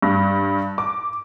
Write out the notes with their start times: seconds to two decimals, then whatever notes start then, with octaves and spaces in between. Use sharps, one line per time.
0.02 G2
0.78 D6